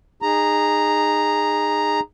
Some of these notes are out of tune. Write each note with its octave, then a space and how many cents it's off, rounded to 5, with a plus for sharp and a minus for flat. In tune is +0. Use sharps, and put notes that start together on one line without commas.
D#4 -25 G#4 -15 A#5 +0